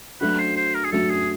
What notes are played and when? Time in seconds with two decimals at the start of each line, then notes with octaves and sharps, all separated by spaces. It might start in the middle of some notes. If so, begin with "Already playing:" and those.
0.21 F#3 A3 D4 F#4 B4
0.39 C5
0.57 C5
0.74 A#4
0.85 G#4
0.92 F#3 A3 D4 F#4 A4
1.10 G#4